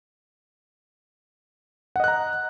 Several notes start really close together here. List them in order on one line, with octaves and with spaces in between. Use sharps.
F#5 D#5 F#6 A#5